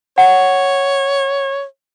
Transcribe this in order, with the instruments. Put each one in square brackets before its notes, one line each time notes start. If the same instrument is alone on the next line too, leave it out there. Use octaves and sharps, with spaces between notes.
[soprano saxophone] C#5 [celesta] F#5